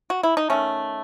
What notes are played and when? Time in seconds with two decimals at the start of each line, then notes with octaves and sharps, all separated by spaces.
0.10 F#4
0.23 E4
0.37 D#4
0.50 D#3 A3 C#4